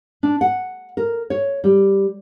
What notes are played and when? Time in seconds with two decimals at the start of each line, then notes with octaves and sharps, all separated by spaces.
0.23 D4
0.41 F#5
0.97 A#4
1.30 C#5
1.64 G3